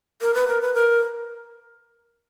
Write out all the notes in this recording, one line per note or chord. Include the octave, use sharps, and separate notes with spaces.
A#4
B4
A#4
B4
A#4